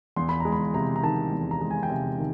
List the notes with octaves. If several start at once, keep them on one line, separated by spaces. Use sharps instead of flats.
E2 C6
B5
G#3 A#5
B5
C3 A#5
A#5
D#3 A5
E2
A#5
G#3
G#5
G5
C3 G#5
D#3